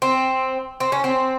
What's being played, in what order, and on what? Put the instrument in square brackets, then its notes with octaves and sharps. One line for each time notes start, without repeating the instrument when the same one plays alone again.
[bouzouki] C4
C4
C#4
C4